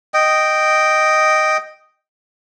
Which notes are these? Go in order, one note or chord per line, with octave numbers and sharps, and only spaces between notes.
D#5 G5